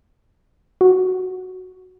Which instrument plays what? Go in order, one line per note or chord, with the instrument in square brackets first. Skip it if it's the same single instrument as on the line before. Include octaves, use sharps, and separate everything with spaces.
[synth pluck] F#4